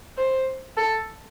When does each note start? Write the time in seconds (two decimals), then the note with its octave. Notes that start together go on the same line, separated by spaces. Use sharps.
0.18 C5
0.77 A4